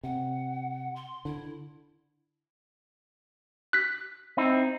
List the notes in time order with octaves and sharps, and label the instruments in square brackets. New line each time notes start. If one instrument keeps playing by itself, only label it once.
[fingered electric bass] C3 [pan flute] F#5
[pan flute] C6
[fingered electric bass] D3 [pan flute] E4
[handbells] F#6 B6
[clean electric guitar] C4 D#4 E4